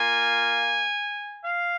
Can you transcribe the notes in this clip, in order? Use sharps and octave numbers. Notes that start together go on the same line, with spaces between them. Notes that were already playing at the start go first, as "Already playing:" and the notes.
Already playing: A#3 F4 G#5
F5